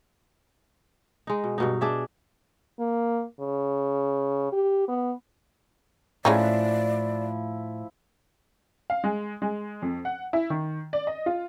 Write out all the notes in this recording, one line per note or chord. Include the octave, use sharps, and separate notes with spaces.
G#3 D#4
B2
G2 B2 D#4
D4 G#4 E5
A#3
C#3
G4
B3
A2 F3 G#3 C#4 D#4 E4 D5
F5
G#3
G#3
F2
F#5
E4
D#3
D5
D#5
F4